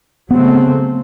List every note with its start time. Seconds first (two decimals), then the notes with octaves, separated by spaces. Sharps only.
0.31 C#3 F#3 A3 B3 C4